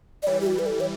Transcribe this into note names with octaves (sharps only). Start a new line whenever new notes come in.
D5
E3 G3 C#5
G4
F#4
B4
A4
C#5